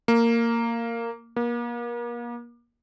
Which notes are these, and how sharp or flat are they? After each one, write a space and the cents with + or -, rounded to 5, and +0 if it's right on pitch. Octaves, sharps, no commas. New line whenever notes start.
A#3 -10
A#3 +35